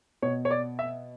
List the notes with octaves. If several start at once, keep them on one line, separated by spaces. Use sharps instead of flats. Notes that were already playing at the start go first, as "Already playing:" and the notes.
B2 C#5
C#5
D5
E5